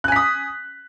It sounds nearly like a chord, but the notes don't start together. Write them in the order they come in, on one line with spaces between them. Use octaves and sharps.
F#6 G#5 B6 D#6